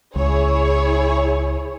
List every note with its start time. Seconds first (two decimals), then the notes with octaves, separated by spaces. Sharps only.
0.16 C#2 E4 G#4 C#5